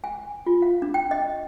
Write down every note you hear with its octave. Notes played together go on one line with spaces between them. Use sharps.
G#5
F4
F5
D4
G5
D#5